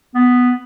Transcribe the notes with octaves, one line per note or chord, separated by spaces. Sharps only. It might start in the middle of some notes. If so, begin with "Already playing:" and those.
B3